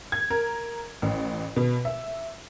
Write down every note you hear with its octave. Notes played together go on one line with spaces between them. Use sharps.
G#6
A#4
A1
B2
E5